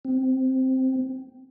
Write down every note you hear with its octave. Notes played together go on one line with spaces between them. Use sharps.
C4